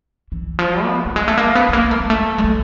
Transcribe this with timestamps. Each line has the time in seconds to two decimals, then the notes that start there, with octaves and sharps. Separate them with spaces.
0.32 E3
0.59 F3
0.84 B3
1.05 G3
1.16 G#3
1.28 A3
1.38 A#3
1.55 B3
1.69 A3
1.73 A#3
1.91 A3
2.00 G#3
2.10 A3
2.38 G#3
2.44 A3